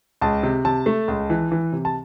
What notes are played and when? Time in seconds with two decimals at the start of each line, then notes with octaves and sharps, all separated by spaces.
0.22 C#2 A5
0.43 C3
0.65 C3 A5
0.86 A3
1.08 C#2
1.30 E3
1.52 E3
1.73 C3
1.85 A5